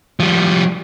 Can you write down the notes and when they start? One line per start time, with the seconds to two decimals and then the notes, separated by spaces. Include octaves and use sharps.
0.20 F3 G3